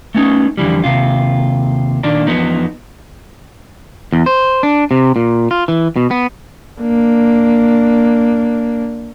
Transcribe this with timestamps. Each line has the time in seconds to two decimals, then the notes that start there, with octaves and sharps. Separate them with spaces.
0.15 A3 B3 C#4 D#4
0.57 F2 D3 E3 G3
0.84 D#2 C3 F4
2.03 A#2 D#3 A#3 D4
2.27 E2 F3 B3 D#4
4.13 E2
4.26 C5
4.63 D4
4.91 C3
5.16 A#2
5.51 F4
5.68 E3
5.96 B2
6.11 B3
6.80 A#3 D4